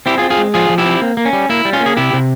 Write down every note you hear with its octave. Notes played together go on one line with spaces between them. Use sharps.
C4 E4 G4
F4 G#4
C4
F4 G#4
G#3
F3 F4 G#4
F3
E4 G4
C4
A#3
A#3
C#4
G3
A#3 E4
G3
C#4 F4
A#3
G#4
C3 E4 G4
C3